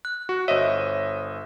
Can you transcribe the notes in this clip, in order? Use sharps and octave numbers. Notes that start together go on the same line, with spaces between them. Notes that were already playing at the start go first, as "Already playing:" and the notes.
F#6
F#4
G1 C5 C#5 D#5 E5